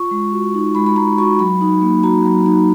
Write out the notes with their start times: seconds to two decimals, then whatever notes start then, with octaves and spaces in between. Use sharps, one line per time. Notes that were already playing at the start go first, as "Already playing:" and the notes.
Already playing: F4 C#6
0.11 G#3
0.33 F#4
0.54 D#4
0.75 G#3 B5
0.86 B5
0.96 G#3 A#5
1.18 F#4 C#6
1.39 F#3 B5
1.61 D#4
1.82 A#3
2.03 F#4 A#5
2.25 F#3
2.46 D#4